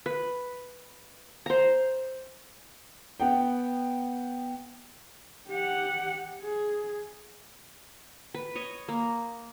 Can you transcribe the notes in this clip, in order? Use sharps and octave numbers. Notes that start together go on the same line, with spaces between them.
B4
C5 A#5
B3 F#5 G5
G4 F#5
G#4
B4
C#5 D#5
A#3